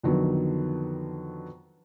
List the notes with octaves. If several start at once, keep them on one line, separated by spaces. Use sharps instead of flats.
F2 D3 D#3 F#3 B3